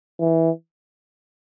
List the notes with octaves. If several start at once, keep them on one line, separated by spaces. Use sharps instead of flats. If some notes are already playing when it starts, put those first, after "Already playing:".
E3